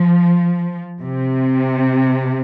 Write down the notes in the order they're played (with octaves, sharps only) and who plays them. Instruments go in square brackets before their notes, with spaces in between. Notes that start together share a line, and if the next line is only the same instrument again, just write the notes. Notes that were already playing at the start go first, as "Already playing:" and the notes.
Already playing: [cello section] F3
C3